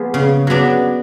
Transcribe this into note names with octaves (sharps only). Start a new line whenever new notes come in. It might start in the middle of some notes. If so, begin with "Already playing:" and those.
Already playing: F3 G#3 A#3 B3
C#3
F#3 B3 D4